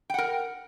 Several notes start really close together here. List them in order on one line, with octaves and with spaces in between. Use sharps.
G5 F#5 A#4